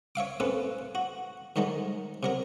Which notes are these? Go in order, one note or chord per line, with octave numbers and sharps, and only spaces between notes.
C#5 E5 F5 D6
A3 C4 C#4 A4 B4
F#4
G#2 D#3 F#3 G#3 A3
C3 F#3 A#4